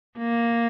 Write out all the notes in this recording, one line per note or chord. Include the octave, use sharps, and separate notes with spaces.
A#3